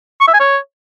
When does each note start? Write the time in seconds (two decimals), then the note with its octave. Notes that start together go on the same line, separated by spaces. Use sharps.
0.21 C#6
0.27 E5
0.34 G#5
0.40 C#5